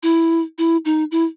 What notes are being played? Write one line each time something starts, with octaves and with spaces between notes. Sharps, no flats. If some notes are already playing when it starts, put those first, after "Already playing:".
E4
E4
D#4
E4